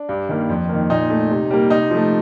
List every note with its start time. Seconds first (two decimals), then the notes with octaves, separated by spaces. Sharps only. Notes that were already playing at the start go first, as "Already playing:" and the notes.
Already playing: D4
0.09 G2
0.29 D#3 G3 A#3
0.49 F2
0.69 D#3 A#3
0.90 A#2 D#4
1.10 A3
1.30 C3
1.51 G3 A#3
1.70 C3 D#4
1.90 F3 A3